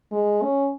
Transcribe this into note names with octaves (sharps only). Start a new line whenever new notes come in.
G#3
C#4